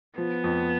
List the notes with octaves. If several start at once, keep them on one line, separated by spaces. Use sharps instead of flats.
F3 B3
F2